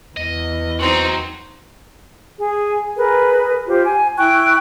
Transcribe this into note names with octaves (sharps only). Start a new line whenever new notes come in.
E2 D#5
C4 D#4 F#4 A#5
G#4
G#4 A#4 B4
F4 G4 C5
G#5
E4 G5 C#6 F#6